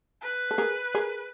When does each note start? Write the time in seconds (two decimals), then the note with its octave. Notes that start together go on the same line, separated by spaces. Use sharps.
0.22 B4
0.51 A4
0.58 G#4 A#4
0.95 G#4 A#4